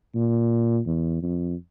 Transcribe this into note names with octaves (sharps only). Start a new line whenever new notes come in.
A#2
E2
F2